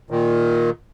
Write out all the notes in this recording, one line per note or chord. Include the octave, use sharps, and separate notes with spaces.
A#2 D#3